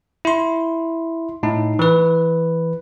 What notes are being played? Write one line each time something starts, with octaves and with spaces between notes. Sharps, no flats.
E4 C6
A2 D#4
E3 B4